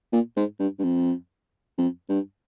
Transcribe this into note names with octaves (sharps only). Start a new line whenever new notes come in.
A#2
G#2
G2
G2
F2
F2
G2